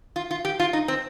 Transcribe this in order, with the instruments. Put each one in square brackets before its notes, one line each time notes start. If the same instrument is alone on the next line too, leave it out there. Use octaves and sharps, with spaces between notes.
[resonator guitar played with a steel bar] F4
F4
G4
F4
D#4
C4